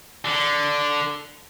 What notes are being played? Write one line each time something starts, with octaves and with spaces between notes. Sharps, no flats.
D3